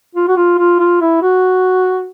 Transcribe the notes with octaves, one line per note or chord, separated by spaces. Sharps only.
F4
F#4
F4
F4
F4
E4
F#4